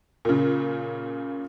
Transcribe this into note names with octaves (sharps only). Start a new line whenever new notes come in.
A#2 C#3